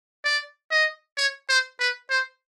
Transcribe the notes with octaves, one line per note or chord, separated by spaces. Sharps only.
D5
D#5
C#5
C5
B4
C5